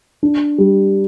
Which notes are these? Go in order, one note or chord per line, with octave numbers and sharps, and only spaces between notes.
D4
G3